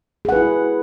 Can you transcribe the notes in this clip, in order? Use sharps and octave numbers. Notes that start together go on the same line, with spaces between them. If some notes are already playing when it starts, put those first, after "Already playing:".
E4 G#4 B4 F#5